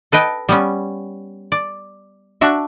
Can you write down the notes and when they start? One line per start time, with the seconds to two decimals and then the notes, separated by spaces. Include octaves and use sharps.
0.12 A4 B4 D#5 G5
0.49 G3 B3 C#4
1.52 D5
2.41 D4 F#4 E5